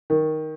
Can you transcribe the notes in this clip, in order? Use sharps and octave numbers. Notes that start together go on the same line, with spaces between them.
D#3